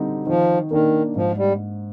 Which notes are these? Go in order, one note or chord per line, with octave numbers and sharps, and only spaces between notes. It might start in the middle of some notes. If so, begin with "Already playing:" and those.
Already playing: D3 G3 C4 D#4
D#3 F3
D#3 A#3 D4
G#2 F3
G3